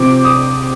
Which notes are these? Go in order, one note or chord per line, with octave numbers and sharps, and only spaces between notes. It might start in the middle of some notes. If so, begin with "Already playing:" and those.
Already playing: C3 F3 C4 D6
D#6